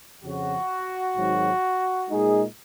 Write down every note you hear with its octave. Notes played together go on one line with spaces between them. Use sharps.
F2 C#3 F3 F#4
G#1 G#2 F#3
A#2 G#3 D#4 G#4